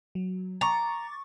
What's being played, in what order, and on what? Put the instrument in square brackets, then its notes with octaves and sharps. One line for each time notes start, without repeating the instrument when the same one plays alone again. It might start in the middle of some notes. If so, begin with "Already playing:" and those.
[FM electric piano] F#3
[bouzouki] A#5 [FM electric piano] C#6 D6 A6